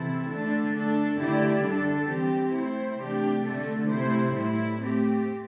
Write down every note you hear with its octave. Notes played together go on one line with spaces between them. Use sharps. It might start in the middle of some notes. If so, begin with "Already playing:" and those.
Already playing: C3 E3 C4 E4 A4
D3 A3 D4 A4
A3 D4 A4
D3 A3 E4 G4 D5
D3 G3 D4 A4
E3 C4 G4
A3 C4 E4 C5
C3 E3 A3 D4 G4
D3 A3 D4 A4
C3 A3 E4 C5
A2 G3 E4
A3 C4 G4